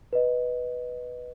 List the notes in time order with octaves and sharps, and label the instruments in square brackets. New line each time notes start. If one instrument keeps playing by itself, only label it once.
[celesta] B4 D#5